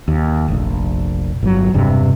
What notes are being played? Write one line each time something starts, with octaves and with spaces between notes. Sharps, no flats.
D#2
F1 A#1
G1 F#3
E1 G2 C3